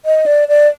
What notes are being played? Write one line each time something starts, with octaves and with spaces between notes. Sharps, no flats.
D#5
D5
D5